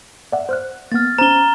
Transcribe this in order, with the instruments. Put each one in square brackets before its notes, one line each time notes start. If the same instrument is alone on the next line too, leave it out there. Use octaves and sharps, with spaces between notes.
[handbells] D5 E5 F#5
C5 F6 F#6
[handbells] A#3 B3 [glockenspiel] F6 A6
[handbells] C#4 C5 [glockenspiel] A#5 G7